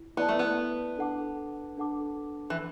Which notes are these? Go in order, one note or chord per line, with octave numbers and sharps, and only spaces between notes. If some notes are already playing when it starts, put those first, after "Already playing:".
Already playing: E4
B3 E4 D5 A5
A3
B3
D4 A4 F#5 A5 D6
D4 A4 F#5 A5 D6
E3